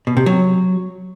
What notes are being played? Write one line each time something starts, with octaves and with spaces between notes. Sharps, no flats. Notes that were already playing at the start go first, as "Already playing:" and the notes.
B2
C3
F#3